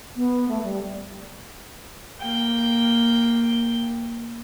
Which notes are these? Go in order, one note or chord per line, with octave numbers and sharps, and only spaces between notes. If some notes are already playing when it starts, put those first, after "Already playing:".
B3
A3
G3
A#3 G5